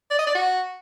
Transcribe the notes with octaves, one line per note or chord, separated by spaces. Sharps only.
D5
D#5
D5
F#4